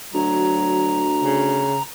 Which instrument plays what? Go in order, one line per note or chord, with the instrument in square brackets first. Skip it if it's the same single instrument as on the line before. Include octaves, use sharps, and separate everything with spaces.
[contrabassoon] D2 [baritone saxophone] F#3 [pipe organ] A#5
[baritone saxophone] C#3